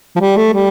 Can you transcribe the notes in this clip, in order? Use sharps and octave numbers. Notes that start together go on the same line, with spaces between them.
F3
G3
A3
G3